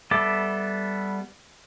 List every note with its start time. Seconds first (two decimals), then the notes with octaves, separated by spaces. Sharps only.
0.11 G3 B3 A4 E5 D6